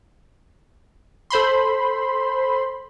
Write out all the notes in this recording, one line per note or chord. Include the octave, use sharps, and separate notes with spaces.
A4 C5 B5 C6